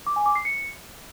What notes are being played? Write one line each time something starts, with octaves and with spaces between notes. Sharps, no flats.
D6
G#5
D6
C7
C#7